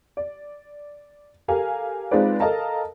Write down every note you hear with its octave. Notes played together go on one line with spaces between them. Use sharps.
D5
G4 A4 A#4 F5 G#5
G#3 C4 D#4 F4 B4 D5
A4 A#4 D#5 F5 A5 A#5